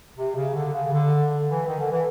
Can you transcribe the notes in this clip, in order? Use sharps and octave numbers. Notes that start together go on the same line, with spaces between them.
C3
C#3
D3
C#3
D3
E3
D#3
D3
E3